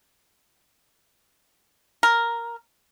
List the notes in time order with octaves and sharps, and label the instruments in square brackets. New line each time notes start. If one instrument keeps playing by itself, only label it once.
[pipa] A#4